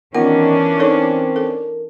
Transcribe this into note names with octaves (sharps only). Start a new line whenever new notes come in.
D#3 E3 B3 C#4 D4 F4 A#4 F#5
C4 D#4 A4 C#5
A4